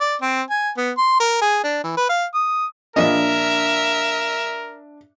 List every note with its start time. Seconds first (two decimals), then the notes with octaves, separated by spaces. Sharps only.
0.01 D5
0.22 C4
0.50 G#5
0.77 B3
0.97 C6
1.20 A#4
1.41 G#4
1.63 D4
1.83 E3
1.97 B4
2.09 F5
2.34 D#6
2.96 A#1 D4 A#4 D#5 E5